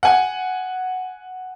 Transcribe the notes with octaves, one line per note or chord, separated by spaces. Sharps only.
F#5 G#5